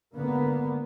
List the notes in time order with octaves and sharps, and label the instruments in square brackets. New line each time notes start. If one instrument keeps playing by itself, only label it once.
[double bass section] G#1 D3 A#3 B3